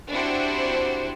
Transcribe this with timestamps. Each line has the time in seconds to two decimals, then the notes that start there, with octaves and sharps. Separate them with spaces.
0.10 C4 D4 E4 F#4 G4 C5